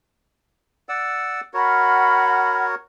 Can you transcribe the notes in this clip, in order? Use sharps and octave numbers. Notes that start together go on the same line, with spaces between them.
D5 F#5 E6
F#4 A#4 C#5 F#5 B5 F6